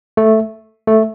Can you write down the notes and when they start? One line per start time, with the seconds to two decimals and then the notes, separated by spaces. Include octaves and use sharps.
0.17 A3
0.88 A3